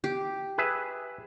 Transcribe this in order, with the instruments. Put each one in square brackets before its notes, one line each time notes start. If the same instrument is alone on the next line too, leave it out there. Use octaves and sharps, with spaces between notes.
[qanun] G4
[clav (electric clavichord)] G#4 B4 E5